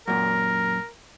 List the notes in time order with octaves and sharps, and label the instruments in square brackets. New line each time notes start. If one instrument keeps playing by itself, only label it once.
[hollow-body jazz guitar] F#2 A#2 [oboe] A#4